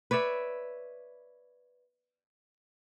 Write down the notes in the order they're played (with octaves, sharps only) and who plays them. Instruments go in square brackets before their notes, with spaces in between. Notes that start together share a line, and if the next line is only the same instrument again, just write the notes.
[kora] B4 C#5 D5 E5